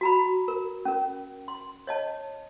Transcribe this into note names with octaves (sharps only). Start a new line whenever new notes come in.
F#4 A#5 B5
A#4
C#4 A#4
C6
C#5 D#5 A5